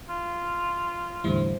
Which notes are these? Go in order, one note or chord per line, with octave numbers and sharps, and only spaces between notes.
F4
E2 A2 D3 G3 E4 C5